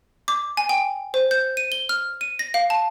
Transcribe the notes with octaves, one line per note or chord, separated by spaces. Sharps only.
D6
G#5
G5
C5
G6
D#7
G7
F6
D#7
A#6
F5
A5